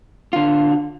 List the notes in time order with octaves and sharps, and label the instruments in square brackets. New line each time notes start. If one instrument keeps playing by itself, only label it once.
[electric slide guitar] D3 F4